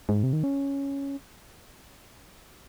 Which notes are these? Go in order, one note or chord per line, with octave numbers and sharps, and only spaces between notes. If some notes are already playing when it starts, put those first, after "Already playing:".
G#2
C3
D#3
C#4